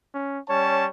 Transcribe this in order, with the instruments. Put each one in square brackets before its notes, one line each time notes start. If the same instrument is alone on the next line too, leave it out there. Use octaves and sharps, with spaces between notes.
[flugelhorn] C#4
[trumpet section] G3 C#4 A5 [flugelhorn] C#5